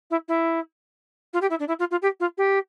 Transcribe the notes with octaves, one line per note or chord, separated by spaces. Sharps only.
E4
E4
F4
G4
E4
D4
E4
F4
F4
G4
F4
G4